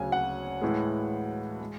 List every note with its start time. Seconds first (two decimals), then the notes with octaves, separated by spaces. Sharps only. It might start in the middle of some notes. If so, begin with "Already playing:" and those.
Already playing: D2 C#3 F#3 G#5
0.12 F#5
0.62 A2 E3 G#3
1.60 G#3